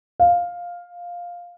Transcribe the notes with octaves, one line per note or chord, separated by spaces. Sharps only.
F5